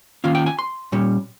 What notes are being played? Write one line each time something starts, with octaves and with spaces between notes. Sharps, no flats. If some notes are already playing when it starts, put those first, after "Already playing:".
D#3 A#3 C#4 F4 F5
G5
G#5
C6
A#2 G3 C#4